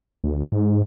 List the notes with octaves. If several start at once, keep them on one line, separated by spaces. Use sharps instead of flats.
D2
G#2